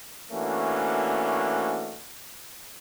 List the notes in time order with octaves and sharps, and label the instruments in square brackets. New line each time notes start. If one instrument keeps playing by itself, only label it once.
[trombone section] E3 A3 A#3 C#4 D4 F#4